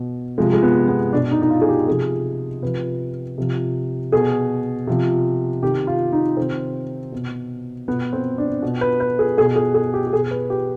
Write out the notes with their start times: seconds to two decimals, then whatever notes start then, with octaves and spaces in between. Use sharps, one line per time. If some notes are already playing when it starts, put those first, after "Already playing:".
Already playing: B2
0.38 C3 F3 G#3
0.53 G#3
0.63 B3
0.88 B3
1.13 B2 D4
1.31 D#4
1.42 D#4
1.50 F4
1.61 G#4
1.69 G4
1.87 C3 F3 G#4
2.62 C3 F3 B4
3.38 C3 F3
4.12 B2 G#4
4.87 C3 F3
5.63 C3 D#3 G4
5.87 F4
6.13 D#4
6.37 C3 D#3 C4
7.12 B2
7.88 B2 B3
8.13 C4
8.38 D4
8.62 B2
8.81 B4
9.00 B4
9.19 G#4
9.37 B2 G#4
9.56 G#4
9.74 G#4
9.94 G4
10.07 G4
10.12 B2 G#4
10.31 B4
10.50 G4